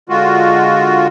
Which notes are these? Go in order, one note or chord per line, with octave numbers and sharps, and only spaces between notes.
D3 G#3 F4 F#4